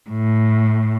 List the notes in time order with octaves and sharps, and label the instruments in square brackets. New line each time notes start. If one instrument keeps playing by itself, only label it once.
[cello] A2